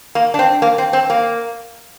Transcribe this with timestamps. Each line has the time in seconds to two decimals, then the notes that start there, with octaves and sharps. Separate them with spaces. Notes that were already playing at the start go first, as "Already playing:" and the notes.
0.15 A#3
0.34 D4
0.39 C4
0.62 A#3
0.78 C4
0.93 C4
1.10 A#3